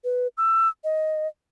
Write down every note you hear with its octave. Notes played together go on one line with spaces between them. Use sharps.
B4
E6
D#5